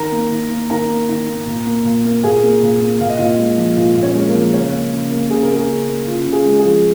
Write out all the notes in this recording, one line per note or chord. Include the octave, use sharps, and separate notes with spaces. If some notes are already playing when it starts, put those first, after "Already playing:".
Already playing: D#3 A#4 A#5
A#3
D#3
A#3
D#3 A#4 A#5
A#3
D#3
A#3
A#2
A#3
A#2
A#3
A#2 G#4 G#5
A#3
A#2
A#3
A#2 F5
D#5
A#2 F4 F5
G#3
F3
A#2 F4 F5
A#2
C#4 C#5
G#3
A#3 A#4
F3
C#3 C#4 C#5
A#3
C#3
A#3
C#3 G#4
A#4
A#3
G#4
C#3
A#3
C#3 F4
C#3
G#4
G#3
G#4
F3